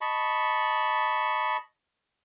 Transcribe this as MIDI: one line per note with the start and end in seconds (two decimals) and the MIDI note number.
0.01 1.57 75
0.01 1.57 81
0.01 1.57 83
0.01 1.57 85